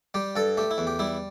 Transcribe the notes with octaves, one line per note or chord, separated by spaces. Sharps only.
G3 G4
G2 A4
A3 G4
E4
E2
G4
G3 E4